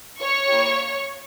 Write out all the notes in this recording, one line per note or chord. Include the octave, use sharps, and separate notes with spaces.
C#5 C#6
A#3 E4 G4